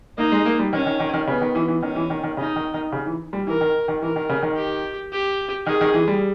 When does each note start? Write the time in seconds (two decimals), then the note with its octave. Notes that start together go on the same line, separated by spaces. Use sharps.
0.17 A#3 D#4
0.32 G#3
0.45 A#3
0.59 G3
0.72 D#3 C#4
0.86 D#3
1.00 D#3
1.13 D#3
1.27 C#3 B3
1.41 D#3
1.55 E3
1.68 E3
1.82 D#3 C#4
1.95 E3
2.10 D#3
2.23 D#3
2.37 C#3 D#4
2.56 D#3
2.74 D#3
2.92 C#3
3.06 E3
3.33 G3
3.47 E3 A#4
3.61 D#3
3.88 D#3
4.01 E3 A#4
4.16 D#3
4.29 C#3
4.43 D#3
4.57 G4
5.12 G4
5.66 D#3 G#4
5.81 D#3
5.94 E3
6.08 G3